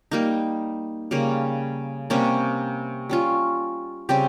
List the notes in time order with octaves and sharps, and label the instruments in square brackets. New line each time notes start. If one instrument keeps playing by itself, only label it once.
[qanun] G3 A#3 D#4
C#3 G3 A#3
C3 G3 A#3 C#4
G3 C#4 F4
C#3 G3 C4 G4